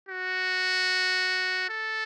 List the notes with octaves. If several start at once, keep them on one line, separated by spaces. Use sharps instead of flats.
F#4
A4